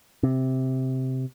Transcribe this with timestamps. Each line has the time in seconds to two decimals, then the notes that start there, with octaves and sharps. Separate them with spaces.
0.23 C3